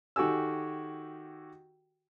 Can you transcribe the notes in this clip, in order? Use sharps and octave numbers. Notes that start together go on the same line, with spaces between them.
D#3 F#4 G4 A4 G#5 E6